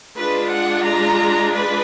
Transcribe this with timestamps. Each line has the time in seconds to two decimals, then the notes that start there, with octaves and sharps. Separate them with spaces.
0.18 G#3 D4 F4 B4
0.52 F#5
0.85 A#5
1.52 B4